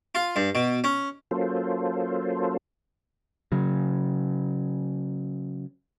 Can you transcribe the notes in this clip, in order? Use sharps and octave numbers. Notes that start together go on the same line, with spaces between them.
F4
G2
B2
C#4
F#3 A#3 C#4 F4 A4 C5
C#3 F#3